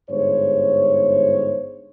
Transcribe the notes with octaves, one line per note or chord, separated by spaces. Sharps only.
G1 G#2 C5 C#5